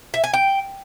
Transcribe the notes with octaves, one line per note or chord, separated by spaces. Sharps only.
E5
G#5
G5